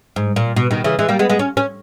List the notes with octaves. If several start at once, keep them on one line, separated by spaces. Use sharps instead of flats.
G#2
A#2
B2
B2 D#3
C#3 E3
E3 G#3
G3 A#3
G#3 B3
G#3 B3
C#4
C#4